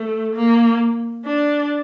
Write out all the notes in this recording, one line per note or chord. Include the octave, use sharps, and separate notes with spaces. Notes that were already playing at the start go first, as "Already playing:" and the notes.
Already playing: A3
A#3
D4